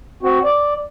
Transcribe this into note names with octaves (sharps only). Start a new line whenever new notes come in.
C4 F#4
D5